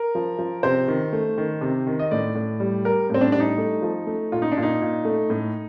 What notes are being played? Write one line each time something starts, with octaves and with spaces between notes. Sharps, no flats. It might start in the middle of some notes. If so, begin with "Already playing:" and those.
Already playing: A#4
F3
F3
C3 C5
D#3
A3
D#3
C3
D#3
D#5
A2 D5
A2
G3
G3 A#4
A2 C4
D4
G3 D4
D#4
A3
F3
A3
A#2 F4
D#4
D4
A#2
D#4
A#2
A3
A2